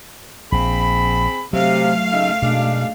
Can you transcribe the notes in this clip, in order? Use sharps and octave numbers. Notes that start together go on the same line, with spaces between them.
A#1 C4 G#4 B5
C3 F#3 A3 F5
C#3 D#4 E5
F#2 B2 G#3 D4